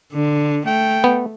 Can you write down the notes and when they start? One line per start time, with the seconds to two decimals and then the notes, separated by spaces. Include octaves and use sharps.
0.13 D3
0.67 A3 G5
1.04 B3